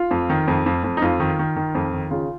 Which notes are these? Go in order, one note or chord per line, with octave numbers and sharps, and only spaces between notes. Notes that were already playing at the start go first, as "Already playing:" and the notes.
Already playing: F4
F2
D#3
F2
F2
F2
D#4
F2 F4
D#3
D#3
D#3
F2
D#3
C#3 F4